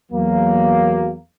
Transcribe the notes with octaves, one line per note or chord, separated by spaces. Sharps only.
E2 F#3 A#3